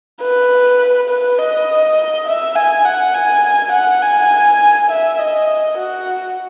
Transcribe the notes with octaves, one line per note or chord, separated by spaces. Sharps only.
B4
B4
D#5
E5
G#5
F#5
G#5
F#5
G#5
E5
D#5
F#4